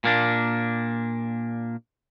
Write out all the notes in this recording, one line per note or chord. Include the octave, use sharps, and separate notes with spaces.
A#2 A#3 D4